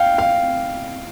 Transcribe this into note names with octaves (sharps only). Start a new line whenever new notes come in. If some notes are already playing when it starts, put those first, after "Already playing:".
Already playing: F5 G5
F5